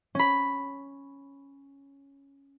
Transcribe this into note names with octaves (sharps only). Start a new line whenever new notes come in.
C#4 B5